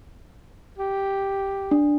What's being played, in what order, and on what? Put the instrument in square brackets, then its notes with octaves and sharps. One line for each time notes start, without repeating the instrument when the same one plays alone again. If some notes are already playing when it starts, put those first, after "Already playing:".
[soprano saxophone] G4
[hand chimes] D4